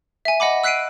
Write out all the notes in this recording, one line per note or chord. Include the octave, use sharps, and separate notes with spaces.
E5 G#5
D#5 F#5 B5 D6
E6 F#6 B6 C7 D7 D#7